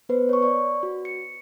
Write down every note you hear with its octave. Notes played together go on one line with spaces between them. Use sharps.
B3 B4 C5
C#5 C#6
D5 C#6
F#4
C#7